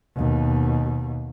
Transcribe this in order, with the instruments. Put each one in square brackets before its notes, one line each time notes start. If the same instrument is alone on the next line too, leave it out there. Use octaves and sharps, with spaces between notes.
[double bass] D#2 B2